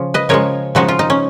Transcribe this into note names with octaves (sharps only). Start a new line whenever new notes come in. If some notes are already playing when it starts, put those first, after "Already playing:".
Already playing: C#3 F3
B4 D#5
C#3 F3 G#3 A#4 C#5
C#3 F3 G#3 D#4 F#4
F4
D#4
C#4